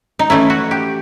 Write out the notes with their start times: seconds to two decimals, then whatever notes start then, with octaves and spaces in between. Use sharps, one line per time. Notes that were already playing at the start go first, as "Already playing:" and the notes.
0.19 D#4
0.30 E3 A3 C#4 E4
0.50 F#4
0.71 G4